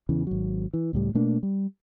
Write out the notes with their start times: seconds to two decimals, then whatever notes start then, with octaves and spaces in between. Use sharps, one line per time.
0.09 E2 C#3 E3
0.27 G#1 F#3
0.74 E3
0.93 C#2 A2 G3
1.15 B2 A3 A#3 D4
1.43 G3